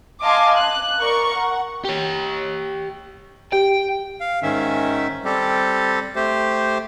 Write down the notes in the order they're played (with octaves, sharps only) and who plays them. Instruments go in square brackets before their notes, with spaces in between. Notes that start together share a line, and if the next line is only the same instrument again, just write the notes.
[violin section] D#5 F5 G#5 A5 C6 D6
F#6
A#4 D5 C#6
F#5
[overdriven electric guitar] G4 C#5
[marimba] G4 [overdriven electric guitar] G5
[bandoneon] F5
G#2 D#3 C#4 E5
G3 C4 G4 A4
A3 G4 C5